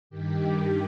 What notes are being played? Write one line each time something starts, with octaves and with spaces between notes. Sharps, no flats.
G2 D#3 G4